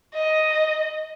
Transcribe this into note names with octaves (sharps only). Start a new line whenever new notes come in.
D#5